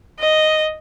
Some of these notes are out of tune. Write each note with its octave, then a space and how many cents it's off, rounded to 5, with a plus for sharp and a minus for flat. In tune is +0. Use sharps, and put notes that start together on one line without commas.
D#5 +0